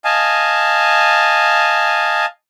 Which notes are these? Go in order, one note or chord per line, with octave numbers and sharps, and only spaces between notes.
D#5 F5 G#5 A5